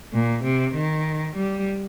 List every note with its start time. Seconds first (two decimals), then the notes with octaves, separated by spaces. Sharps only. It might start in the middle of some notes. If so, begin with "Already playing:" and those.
0.13 A#2
0.44 C3
0.75 D#3
1.36 G3